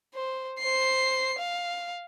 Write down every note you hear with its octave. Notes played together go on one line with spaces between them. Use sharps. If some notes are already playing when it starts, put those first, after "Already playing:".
C5
C5 C7
F5